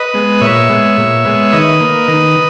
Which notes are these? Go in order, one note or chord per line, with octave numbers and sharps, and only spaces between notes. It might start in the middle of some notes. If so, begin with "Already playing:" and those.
Already playing: B4 D#5
G#3 B3
A#2 C#5 E5
G#3 B3
A#2
G#3 B3
D#3 B4 D#5
A#3
D#3